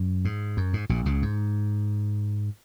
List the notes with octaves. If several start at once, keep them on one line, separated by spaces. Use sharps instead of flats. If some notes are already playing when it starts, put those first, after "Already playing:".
Already playing: F#2
G#2
F#2
G#2
A#1 A#2
C#2 C#3
G#2